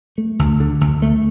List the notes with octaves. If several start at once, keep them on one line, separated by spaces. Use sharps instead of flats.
A3
D2
D3
D2
A3